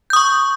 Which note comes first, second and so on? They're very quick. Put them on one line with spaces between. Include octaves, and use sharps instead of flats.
G6 D#6 C#6